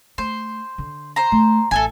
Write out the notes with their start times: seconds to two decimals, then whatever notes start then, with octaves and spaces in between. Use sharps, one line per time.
0.18 A3 C5
0.78 D3
1.16 C5 A#5
1.32 A3
1.71 A1 E4 A4 E5 G#5